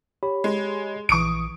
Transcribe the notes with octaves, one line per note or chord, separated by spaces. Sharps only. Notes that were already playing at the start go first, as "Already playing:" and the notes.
G4 C#5 B5
G#3
A#1 E3 C#6 D#6 D7